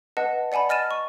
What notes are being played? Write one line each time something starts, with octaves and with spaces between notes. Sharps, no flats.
B4 D#5 F#5 A5
D5 F#5 G#5 A5 B5
D#5 F6 A6 D#7 E7
C#6